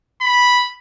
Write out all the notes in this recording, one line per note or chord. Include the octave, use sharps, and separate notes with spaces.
B5